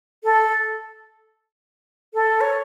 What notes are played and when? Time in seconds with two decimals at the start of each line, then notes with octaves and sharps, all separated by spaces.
0.24 A4
2.14 A4
2.41 C#5